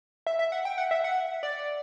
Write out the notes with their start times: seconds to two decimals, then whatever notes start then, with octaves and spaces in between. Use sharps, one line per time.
0.27 E5
0.39 E5
0.52 F#5
0.65 G5
0.78 F#5
0.91 E5
1.04 F#5
1.43 D5